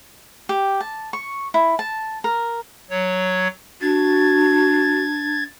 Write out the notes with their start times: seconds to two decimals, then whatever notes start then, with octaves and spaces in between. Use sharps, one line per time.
0.49 G4
0.81 A5
1.13 C#6
1.54 E4
1.79 A5
2.24 A#4
2.90 F#3 C#5
3.81 D4 F#4 G#6 A6